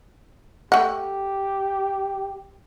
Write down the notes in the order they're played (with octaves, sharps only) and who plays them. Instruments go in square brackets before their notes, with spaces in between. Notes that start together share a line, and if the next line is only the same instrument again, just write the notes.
[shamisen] A3 F#5 [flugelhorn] G4